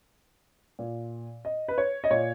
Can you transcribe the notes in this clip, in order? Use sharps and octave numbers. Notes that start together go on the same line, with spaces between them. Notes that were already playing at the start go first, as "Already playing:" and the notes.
A#2
D#5
B4
C#5
D#5
A#2 C#5